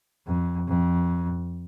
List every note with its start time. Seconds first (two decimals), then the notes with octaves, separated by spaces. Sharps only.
0.27 F2
0.68 F2